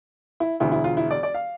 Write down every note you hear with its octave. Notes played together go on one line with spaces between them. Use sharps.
E4
E1 D2 D3 E4
E4
F4
E4
D5
D5
F5